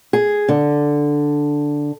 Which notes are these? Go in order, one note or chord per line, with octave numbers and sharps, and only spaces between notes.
G#4
D3